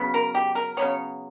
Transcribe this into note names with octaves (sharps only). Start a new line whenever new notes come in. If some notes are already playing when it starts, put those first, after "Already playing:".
Already playing: C#3 F#3 B3
A#4
G4
A#4
C#3 F#3 B3 C#5